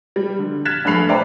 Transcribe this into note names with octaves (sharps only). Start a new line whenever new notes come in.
G3
D3
F6 F#6 G#6 A6 B6 E7
A#1 G2 A3 B5 C7 F7
B4 C5 D5 E5 G5 A#5